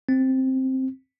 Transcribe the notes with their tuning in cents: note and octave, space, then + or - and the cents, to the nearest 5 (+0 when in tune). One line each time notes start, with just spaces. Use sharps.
C4 +5